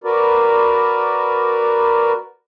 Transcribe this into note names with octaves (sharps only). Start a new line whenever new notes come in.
F#4 A#4 B4 D5